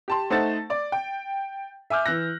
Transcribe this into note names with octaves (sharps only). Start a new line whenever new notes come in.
G4 A5 C6
A3 D#4 C5 F#5 A5 A6
D5 D6
G5
E5 G#5 D6 F6 G6
E3 E6 F#6 A#6